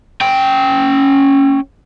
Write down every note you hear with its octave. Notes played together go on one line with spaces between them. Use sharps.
C#4 G5